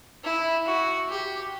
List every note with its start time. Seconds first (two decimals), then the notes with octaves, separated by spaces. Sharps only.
0.24 E4
0.66 F#4
1.09 G4